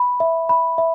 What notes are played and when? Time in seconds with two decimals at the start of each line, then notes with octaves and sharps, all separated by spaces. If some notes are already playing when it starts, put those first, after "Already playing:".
Already playing: B5
0.20 E5
0.49 B5
0.78 E5